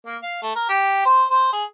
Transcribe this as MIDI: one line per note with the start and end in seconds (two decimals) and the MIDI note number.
0.06 0.17 58
0.23 0.39 77
0.43 0.52 57
0.55 0.66 70
0.69 1.05 67
1.05 1.25 72
1.30 1.48 72
1.53 1.64 68